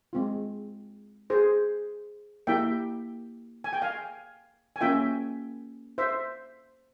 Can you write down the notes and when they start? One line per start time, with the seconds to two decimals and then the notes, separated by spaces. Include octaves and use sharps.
0.13 G#3 C4 F4
1.30 G#4 C5
2.47 A#3 E4 G4 E5 G5
3.64 G#5
3.73 G5
3.82 F5 G#5
4.76 G#5
4.81 A#3 C#4 F4 E5 G5
5.98 C5 E5